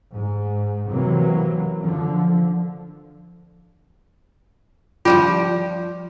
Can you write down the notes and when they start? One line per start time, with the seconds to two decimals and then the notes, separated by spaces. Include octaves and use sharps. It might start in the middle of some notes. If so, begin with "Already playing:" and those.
0.14 G#2
0.91 C3 E3 F#3 A#3
1.80 D3 F3
5.05 F3 G3 F4 G4